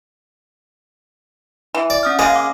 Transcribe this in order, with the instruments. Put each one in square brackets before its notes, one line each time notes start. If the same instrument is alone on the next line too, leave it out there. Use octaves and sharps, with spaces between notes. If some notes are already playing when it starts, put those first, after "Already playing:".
[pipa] E3
[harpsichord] D5
[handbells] C#4 D#6 F6
[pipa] C#3 G#4 [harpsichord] G#3 A#3
[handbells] D6